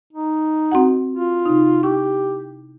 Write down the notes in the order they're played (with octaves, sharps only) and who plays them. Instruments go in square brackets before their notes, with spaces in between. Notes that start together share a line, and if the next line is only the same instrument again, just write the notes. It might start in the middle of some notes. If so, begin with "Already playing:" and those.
[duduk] D#4
[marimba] C4 F#4 F#5
[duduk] F4
[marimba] C3 D#4
[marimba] E4 C#6 [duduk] G4